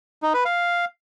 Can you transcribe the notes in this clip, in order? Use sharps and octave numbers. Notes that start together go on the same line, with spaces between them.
D#4
B4
F5